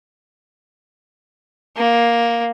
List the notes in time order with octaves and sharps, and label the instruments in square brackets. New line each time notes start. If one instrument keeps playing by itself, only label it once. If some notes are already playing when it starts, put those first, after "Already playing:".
[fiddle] A#3